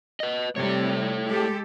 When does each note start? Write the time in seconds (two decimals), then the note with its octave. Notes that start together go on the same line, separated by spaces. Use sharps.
0.20 B4 D#5
0.56 C3 G3 A3 C#5
1.28 G#3 G4 A4